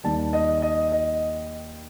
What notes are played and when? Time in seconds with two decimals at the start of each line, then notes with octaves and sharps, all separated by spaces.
0.04 D#2 D#3 G3 A5
0.33 D#5
0.62 D#5
0.92 D#5